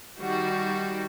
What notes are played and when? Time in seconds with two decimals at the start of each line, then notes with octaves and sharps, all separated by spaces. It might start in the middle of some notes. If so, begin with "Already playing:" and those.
0.18 D#3 G3 F#4